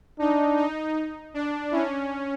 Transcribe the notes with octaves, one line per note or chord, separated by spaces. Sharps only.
D4 D#4
D#4
D4
C#4 E4